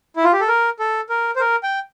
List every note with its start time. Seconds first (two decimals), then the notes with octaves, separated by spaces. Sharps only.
0.16 E4
0.24 F4
0.33 G4
0.41 A4
0.48 A#4
0.79 A4
1.09 A#4
1.36 C5
1.40 A#4
1.63 G5